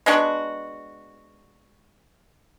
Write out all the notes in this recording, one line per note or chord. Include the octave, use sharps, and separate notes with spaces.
G#3 B3 D4 F#4